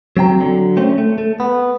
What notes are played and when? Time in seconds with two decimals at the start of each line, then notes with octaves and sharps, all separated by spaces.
0.17 F#3 C4 G5 A#5
0.40 D3 F#3
0.77 A3 C4 C#4
0.98 A3
1.18 A3
1.40 B3